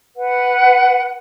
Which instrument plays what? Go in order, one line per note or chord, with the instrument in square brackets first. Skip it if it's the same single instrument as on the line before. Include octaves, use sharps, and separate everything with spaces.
[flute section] B4 F#5